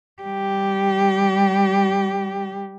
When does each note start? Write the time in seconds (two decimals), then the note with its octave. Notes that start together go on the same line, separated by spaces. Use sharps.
0.23 G3 G4